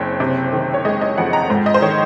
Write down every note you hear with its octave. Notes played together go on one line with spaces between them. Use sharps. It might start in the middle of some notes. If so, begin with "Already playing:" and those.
Already playing: F#1 C4 C#5
C3
D#3
C#5
G#3 D#5
D#5
F2 F#5
A#5
G#2 C5
D#5
C5
D#3 C#5